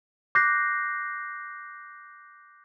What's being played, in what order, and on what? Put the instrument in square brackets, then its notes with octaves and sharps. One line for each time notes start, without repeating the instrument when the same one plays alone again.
[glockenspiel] D6 F#6 G6 A#6 C7